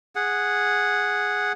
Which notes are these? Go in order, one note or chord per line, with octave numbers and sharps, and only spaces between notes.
G#4 F#5